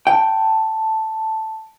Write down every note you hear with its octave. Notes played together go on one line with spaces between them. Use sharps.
G5 A5